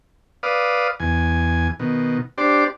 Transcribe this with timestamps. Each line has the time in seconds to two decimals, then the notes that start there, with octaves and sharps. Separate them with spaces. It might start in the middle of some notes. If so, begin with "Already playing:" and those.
0.43 B4 D5 F5 D#6
1.00 E2 G#5
1.79 B2 D#3
2.38 D4 G4 C5 D5